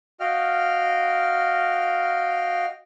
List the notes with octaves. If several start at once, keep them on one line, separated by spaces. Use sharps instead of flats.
F#4 D#5 F5 G5 F6